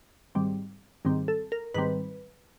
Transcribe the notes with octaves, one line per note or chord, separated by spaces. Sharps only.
G#2 D#3 G3 C4
G#2 D#3 G3 C4
A4
A#4
G#2 D#3 G3 C4 B4